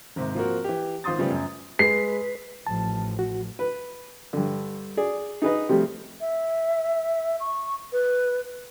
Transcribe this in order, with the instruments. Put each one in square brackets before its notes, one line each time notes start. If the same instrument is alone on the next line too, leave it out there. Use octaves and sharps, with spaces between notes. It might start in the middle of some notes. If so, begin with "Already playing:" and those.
[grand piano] G#1 G#2 C3
F3 A#3 C4 F#4 A#4
E3 G4
G#1 F4 C5 C6 D#6 A6
C#3 F3 G3 A3 B3
F#2
[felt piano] G#3 [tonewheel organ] B4 [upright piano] C7
[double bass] A1 F3 [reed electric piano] A5
[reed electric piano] F#4
[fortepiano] B4
G2 D3
G#4 D5
D#4 G#4 B4 D#5
C3 F3 G3 A3
[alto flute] E5
C#6
B4